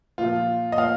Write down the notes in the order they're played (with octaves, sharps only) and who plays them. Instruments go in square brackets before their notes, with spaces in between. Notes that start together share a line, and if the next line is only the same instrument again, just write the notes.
[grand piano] A#2 F3 F4
D#5
A#2 F5